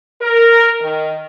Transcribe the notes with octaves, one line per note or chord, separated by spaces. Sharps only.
A#4
D#3